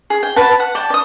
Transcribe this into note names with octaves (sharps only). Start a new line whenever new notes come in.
G#4
G5
B4 F#5 A5
F#5
D5 G5 A5
D5 D#6